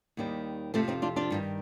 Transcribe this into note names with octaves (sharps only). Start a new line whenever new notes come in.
D#2 D#3 G3
F2 C3 F3 A3 C4
C4 D#4
D4 F4
D4 F4
G2 D#3 G3